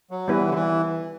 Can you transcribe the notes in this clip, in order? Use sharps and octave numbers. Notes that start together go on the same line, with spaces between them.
F#3
E3 G3 B3 E4 B4
D3
E3